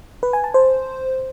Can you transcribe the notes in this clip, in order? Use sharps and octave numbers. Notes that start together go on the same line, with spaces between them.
B4
G#5
A5
C5